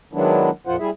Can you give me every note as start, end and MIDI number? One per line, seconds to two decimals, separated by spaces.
0.13 0.50 51
0.13 0.50 54
0.13 0.50 56
0.13 0.50 59
0.13 0.50 62
0.13 0.50 64
0.67 0.76 41
0.67 0.76 46
0.67 0.76 53
0.67 0.76 65
0.67 0.76 72
0.67 0.76 78
0.79 0.90 55
0.79 0.90 64
0.79 0.90 68
0.79 0.90 76